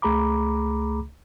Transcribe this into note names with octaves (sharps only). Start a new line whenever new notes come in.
C#2 A3 G#4 A#5 B5 D6